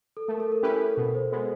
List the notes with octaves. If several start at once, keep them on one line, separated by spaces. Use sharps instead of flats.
A4
A3 A#4
A4
A#4
C#4 E4 G4 A#4 B4
A4
B2 A#4
C5
G#3 B3 B4